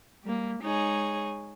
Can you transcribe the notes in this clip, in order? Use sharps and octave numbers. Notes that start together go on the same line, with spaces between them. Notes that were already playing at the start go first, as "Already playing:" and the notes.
G3 A#3
G#3 D#4 G#4 C#5